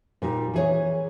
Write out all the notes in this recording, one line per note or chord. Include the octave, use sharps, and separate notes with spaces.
A#2 G3 D#4
E3 G#4 C#5